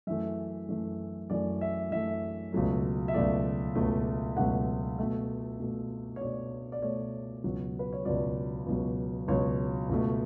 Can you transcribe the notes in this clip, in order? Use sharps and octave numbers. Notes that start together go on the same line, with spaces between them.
F#2 E3 A3 E5
F#2 E3 A3
F#2 E3 A3 D5
E5
F#2 E3 A3 E5
C#2 B2 F#3 A3
E5
C#2 B2 F#3 A3 D5
C#2 B2 F#3 A3
C#2 B2 F#3 A3 F#5
B2 A3 E5
B2 A3
C#5
B2 A3 D5
D5
B2 A3 C#5
C#2 B2 F#3
B4
C#5
C#2 B2 F#3 D5
C#2 B2 F#3
C#2 B2 F#3 C#5
C#2 B2 A3